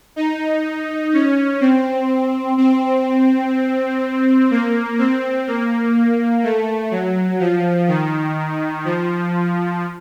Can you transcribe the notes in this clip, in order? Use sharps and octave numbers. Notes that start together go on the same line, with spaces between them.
D#4
C#4
C4
C4
A#3
C4
A#3
A3
F#3
F3
D#3
F3